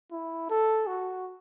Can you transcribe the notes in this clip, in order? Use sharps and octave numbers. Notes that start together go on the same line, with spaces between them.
E4
A4
F#4